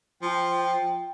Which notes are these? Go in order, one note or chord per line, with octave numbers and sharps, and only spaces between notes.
F3 G5